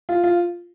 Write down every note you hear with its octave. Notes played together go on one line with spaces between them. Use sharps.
F4
F4